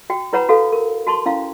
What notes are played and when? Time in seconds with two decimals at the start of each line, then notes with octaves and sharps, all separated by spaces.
0.10 F#4 G5
0.33 E4 B4 C#5 F#5 A#5 B5
0.49 F#4 A4 F5
0.73 A#4
1.07 F#4 A5 C6 C#6
1.26 C#4 E4 F5